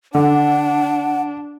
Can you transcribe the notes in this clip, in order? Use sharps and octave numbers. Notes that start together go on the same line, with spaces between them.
D3 D4 F#5